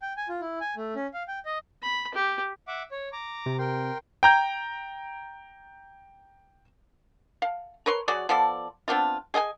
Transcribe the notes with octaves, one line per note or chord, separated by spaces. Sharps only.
G5
G#5
F4
E4
G#5
A3
C#4
F5
G5
D#5
B5
G4
E5 F#5 D6
C#5
A#5 D6
C3
A#4 G5 C6
G5 A#5 G6
F5
A#4 B4 C#5 C6
F#3 F#4 G#4 D5
F3 B3 A4 D5
B3 C4 D4 F4
G#4 D#5 F#5 G#5